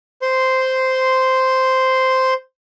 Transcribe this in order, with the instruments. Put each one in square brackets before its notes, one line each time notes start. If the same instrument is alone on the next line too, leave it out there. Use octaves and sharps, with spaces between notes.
[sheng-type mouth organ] C5 C6